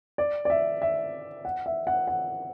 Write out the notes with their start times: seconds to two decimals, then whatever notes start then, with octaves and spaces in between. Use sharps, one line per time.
0.18 D5
0.45 D5
0.50 E5
0.82 E5
1.45 F#5
1.66 E5
1.87 F#5
2.08 F#5